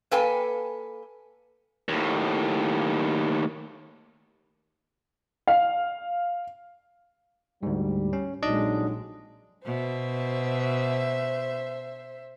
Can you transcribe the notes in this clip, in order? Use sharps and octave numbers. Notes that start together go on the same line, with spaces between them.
A#3 A4 B4 G5 G#5
D#2 A2
F5
D2 G#2 G3
C#4
A#1 F2 F#3 G#3 D4 D#4 D#5
B2 C5 E5